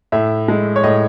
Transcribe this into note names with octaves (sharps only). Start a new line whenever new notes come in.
A2 E5
G#3
C#5
A2 D#5